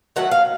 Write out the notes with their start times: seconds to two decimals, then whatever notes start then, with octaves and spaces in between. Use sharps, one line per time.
0.16 D#3 F#3 A3 F#5
0.31 F5